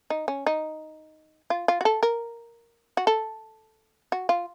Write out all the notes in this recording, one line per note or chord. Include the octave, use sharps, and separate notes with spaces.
D#4
C#4
D#4
F4
F4
F#4
A4
A#4
F#4
A4
F#4
F4